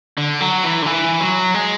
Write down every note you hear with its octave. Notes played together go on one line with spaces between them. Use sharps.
D3
F#3
E3
D3
E3
F#3
G#3